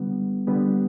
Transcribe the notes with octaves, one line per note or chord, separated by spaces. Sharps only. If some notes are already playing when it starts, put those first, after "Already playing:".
Already playing: D3 G3 B3
D3 G3 B3